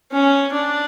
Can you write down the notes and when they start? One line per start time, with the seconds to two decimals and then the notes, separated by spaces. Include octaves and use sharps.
0.12 C#4
0.53 D4